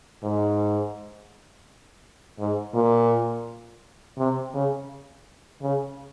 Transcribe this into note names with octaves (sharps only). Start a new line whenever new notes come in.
G#2
G#2
A#2
C3
C#3
C#3